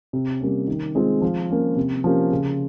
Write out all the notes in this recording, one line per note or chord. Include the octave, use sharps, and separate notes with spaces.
C3
G3 A#3 C#4
D#3
G#3 C4 F4 G#4
F3
A#3 C#4
C3
F3 A#3 C#4 G4
C#3